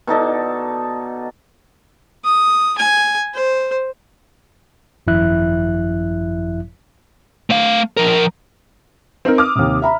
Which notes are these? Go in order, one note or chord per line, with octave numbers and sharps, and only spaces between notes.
B2 D#4 A4 D5
D#6
G#5
C5
G#1 F#2 F3 E4 E5 F#6
A3 F5
F3 A#4
C4 D#4 A#4
D6 D#6 F6
D#2 C3
E5 A#5 B5